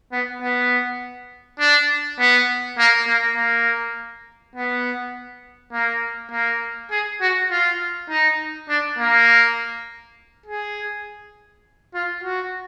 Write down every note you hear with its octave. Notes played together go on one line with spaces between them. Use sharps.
B3
B3
D4
B3
A#3
A#3
A#3
B3
A#3
A#3
G#4
F#4
F4
D#4
D4
A#3
G#4
F4
F#4